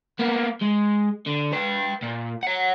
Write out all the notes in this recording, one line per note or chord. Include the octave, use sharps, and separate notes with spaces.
A#3 B3
G#3
D3
B4 G5
A#2
C#5 F#5